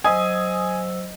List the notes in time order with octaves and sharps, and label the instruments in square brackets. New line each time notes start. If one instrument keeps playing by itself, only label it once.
[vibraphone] F#3 C5 E6 [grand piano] D#5 [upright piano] G#5 [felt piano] D#6